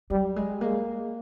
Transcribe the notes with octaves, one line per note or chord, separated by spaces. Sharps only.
F#3 G3
G#3
G#3 A#3